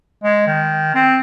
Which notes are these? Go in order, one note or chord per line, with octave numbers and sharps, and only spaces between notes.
G#3
D#3
C4